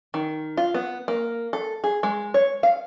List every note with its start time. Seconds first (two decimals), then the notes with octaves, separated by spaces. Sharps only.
0.14 D#3
0.57 F4
0.74 B3
1.08 A#3
1.53 A4
1.84 G#4
2.03 G#3
2.34 C#5
2.63 F5